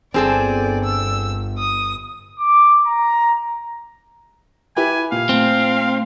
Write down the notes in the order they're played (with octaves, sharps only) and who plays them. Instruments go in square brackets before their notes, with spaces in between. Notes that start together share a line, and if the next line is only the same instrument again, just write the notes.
[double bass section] G1 [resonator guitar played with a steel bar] C4 G#4 A4 [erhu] D5
[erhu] E6
D#6
[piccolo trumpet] D6
A#5
[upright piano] E4 G4 B4 [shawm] G#5
[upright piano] A#2 [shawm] F5
[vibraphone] A3 [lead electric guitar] C4